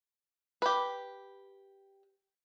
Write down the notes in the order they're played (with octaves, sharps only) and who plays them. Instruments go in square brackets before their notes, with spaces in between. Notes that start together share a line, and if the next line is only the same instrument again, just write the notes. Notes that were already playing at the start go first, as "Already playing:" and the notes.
[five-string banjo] G4 B4